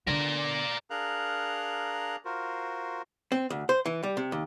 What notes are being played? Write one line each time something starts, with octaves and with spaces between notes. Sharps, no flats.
D3 B3 A#4 D5
D4 G#4 A#4 F5 A#5 F#6
F4 F#4 A#4 C5
C4
D2
C5
E3
G3
C3
D#2